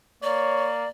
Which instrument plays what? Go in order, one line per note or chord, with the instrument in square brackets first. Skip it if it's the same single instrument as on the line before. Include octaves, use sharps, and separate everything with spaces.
[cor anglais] A#3 [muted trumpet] C#5 [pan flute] D5